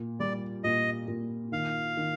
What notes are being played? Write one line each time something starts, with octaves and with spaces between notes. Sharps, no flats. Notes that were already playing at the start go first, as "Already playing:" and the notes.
Already playing: A#2
G3 D5
A#2 D#5
A#2
D#3 F5
D#3